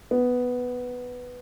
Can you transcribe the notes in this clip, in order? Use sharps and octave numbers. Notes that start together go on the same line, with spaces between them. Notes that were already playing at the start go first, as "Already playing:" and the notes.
B3